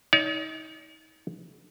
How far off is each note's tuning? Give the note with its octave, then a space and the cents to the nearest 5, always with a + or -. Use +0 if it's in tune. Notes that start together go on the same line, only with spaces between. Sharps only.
D#4 +30 D5 -45